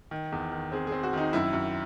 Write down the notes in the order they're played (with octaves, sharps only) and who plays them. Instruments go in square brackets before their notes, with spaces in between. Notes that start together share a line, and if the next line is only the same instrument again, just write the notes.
[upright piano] D#3
E2
D#3
C4 G#4
G#4
C4
F#4
D#3 D#4
F#2 E4
F#2